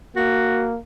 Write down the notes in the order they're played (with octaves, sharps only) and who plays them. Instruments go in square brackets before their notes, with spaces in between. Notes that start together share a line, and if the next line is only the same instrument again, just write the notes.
[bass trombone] A#3 [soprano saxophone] F#4